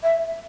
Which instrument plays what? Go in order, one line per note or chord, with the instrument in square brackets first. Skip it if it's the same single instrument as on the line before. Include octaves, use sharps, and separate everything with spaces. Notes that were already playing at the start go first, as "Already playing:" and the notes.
[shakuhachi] E5